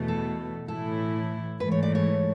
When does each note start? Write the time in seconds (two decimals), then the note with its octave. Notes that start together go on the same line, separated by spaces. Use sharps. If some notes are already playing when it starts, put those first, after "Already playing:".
Already playing: E2 B2 A3
0.08 A4
0.68 A2 E3 A3 E4 A4
1.60 G#2 E3 A3 B4
1.72 C#5
1.83 D5
1.95 C#5